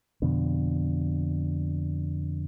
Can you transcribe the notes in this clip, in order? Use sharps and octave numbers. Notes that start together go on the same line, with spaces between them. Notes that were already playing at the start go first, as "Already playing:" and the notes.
F2 B2 D3